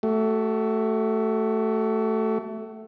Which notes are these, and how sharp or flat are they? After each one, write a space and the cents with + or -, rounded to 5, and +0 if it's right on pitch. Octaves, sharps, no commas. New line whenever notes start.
A3 +0 F#4 +35